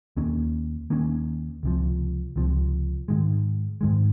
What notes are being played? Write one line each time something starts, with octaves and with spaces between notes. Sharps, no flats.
D#2 D#3 A#3 C#4
D#2 D#3 A#3 C#4
C#2 C3 F3
C#2 C3 F3
G#2 D#3 G#3
G#2 D#3 G#3